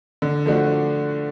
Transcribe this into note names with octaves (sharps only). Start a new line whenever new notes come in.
D3
F3 A3 D4 F#4